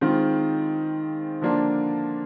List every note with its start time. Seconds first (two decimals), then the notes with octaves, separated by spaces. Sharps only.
0.01 D#3 G#3 C4 F4
1.41 D3 F3 A#3 D4 F4